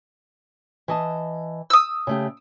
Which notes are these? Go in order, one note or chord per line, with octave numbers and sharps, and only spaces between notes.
E3 D#5 A5
D#6 E6
C#3 A3 G4